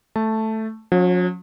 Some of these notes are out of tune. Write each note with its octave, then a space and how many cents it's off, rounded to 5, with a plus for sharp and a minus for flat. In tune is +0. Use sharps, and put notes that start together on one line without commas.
A3 +0 A5 +0
F#3 -45 C#4 +0